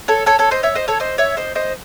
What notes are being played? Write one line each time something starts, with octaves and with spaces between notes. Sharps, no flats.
A4 C#5
A4 C#5
A4 C#5
C5 D#5
C#5 E5
C5 D#5
A4 C#5
C5 D#5
C#5 E5
C5 D#5
C5 D#5